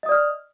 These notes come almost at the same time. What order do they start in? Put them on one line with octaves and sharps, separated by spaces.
D#5 D#6 D5 F6